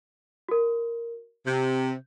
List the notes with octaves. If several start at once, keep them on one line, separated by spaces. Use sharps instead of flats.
F#4 A#4
C3 G6